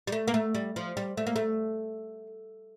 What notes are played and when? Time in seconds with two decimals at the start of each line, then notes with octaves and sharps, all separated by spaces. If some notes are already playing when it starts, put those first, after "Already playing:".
0.07 G3
0.12 A3
0.27 A#3
0.34 A3
0.55 G3
0.76 F3
0.97 G3
1.17 A3
1.27 A#3
1.36 A3